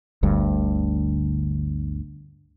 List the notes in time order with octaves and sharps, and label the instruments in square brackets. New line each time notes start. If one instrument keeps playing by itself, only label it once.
[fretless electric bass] G1 D2 G2